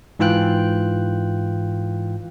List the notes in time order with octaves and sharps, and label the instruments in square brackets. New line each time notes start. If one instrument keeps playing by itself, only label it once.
[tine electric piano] G#2 E3 F4 G5 F#6